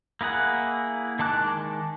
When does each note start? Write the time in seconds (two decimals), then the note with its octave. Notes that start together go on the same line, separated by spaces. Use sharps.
0.21 A#3 E4 G#4 F#5
1.19 D#3 G#3 A5 D6 F#6